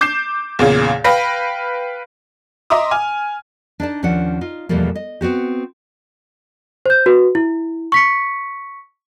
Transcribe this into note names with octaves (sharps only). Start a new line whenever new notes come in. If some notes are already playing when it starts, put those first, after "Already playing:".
D6 G6 C7 E7
E2 A#2 C#3
B4 F5 G5 B5 A#6
D#5 E5 A#5 C6 D6 D#6
G#5 F6 D#7
D4 D#4 D5 A5
D#2 F3 C#4 D4 F#5
D#4 F4
E2 B2 F3 G3 A3 A#3
D#5
B3 C4 F#4 G4
C5 G6
F#4 B4
E4
C#6 B6 C#7